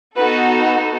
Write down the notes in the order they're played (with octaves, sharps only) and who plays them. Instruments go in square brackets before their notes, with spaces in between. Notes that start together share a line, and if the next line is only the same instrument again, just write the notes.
[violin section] B3 D#4 F#4 A4 B4